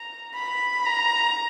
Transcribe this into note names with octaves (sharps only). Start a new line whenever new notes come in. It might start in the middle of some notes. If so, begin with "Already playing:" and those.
Already playing: A#5
B5
A#5